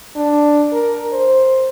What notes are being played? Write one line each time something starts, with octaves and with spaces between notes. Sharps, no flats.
D4
A#4
C5